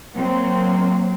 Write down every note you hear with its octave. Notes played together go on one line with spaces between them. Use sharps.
F#3 A#3 C4